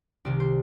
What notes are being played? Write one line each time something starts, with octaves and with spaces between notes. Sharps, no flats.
C2 C3 D#3 D5
C5